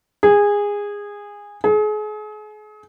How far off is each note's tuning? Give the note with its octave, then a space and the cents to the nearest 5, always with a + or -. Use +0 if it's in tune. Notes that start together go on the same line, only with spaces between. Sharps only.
G#4 -20
G#4 +35